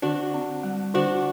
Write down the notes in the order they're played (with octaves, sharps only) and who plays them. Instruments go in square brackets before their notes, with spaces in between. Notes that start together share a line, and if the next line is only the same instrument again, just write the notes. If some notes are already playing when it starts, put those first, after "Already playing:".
[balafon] D3 [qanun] D4 F#4
[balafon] C4
G3
[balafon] D3 [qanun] D4 F#4